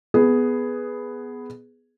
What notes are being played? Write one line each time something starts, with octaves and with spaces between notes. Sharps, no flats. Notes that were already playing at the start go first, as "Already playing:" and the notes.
B3 G#4